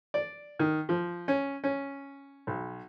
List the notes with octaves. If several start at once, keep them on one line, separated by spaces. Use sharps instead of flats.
D5
D#3
F3
C#4
C#4
B1